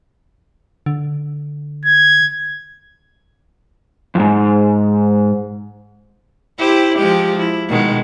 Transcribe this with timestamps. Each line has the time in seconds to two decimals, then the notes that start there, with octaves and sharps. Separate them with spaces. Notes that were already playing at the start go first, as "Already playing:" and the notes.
0.86 D3
1.85 G#6
4.15 F2 G#2
6.58 E4 G4 C5
6.97 F3 G#3 G4
7.39 E4
7.68 B2 D#3 G#3